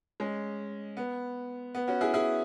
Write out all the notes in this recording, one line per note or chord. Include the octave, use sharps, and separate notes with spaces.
G#3 C#4
B3
B3
C#4 F#4
E4 G#4
E4 G#4